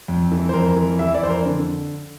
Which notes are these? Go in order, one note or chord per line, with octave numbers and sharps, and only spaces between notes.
F2
E3
C5
F2 A#4
E3
E3 E5
D5
F2 C5
A#4
D3